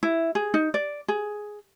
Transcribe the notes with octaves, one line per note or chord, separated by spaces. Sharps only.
E4
G#4
D#4
D5
G#4